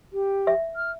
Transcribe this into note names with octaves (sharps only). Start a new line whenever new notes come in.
G4
E5
F6